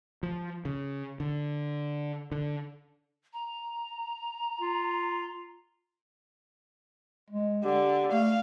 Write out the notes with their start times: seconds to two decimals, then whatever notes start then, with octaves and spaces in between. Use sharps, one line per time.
0.23 F3
0.65 C#3
1.20 D3
2.32 D3
3.33 A#5
4.61 F4
7.30 G#3
7.65 D3 G4
8.12 A3 F5